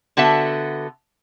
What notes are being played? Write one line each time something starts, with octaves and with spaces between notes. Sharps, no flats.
D3 B3 F#4 A4 E5